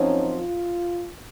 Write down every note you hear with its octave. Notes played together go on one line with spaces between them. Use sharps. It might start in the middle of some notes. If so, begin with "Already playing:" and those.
Already playing: F#2 F3 C4 C#4 D#4 C#5
F4